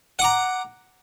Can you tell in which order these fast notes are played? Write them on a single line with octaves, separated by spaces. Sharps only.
F#5 D6 A#5